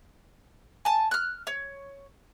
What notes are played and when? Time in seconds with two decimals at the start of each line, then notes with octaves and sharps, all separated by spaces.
0.85 G#5 A5
1.11 F6 F#6
1.47 C#5